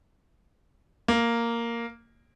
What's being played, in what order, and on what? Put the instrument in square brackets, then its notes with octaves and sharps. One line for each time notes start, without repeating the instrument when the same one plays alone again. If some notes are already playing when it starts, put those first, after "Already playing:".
[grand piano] A#3